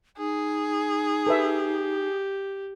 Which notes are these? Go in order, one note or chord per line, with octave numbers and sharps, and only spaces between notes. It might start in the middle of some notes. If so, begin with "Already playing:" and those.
D#4 G#4
G4 A4 B4 E5